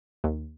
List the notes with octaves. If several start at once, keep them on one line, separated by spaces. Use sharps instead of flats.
D#2